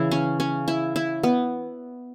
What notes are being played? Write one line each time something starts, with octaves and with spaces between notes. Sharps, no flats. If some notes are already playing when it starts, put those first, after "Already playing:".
Already playing: C#3 E3 E4
C#4
C#4
E4
E4
B3